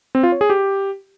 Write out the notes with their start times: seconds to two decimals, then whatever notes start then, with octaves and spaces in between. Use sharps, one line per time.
0.15 C4
0.23 F4
0.32 C#5
0.41 G#4
0.50 G4